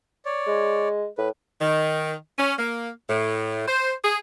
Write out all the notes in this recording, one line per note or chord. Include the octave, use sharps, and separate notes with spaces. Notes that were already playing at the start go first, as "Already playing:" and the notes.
C#5 D5
G#3
A2 B4
D#3
C#4
A#3
A2
C5
G#4